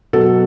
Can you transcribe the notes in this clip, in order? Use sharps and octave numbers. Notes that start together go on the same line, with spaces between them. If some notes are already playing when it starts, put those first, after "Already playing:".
B2 F#3 A4